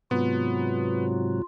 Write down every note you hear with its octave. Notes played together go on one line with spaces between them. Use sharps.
G#2 C3 F#3 B3 F4